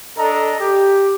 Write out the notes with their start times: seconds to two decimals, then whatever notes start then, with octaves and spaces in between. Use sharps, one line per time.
0.17 D4 A4 D#5 A#5
0.60 G4